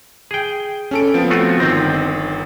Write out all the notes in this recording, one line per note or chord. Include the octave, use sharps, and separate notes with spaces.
G#4 G5
C#4 A4 D7
F3 B3 C4
A3 F4 F#4
G1 D#3 C4 A#6